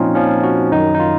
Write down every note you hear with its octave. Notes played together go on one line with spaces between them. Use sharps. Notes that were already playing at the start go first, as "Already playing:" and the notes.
Already playing: A#2 F3 C4 C#4 D#4 F4
A#2 F3 C#4
F#4
F#2 D#3 F#3 D#4
D#4
F4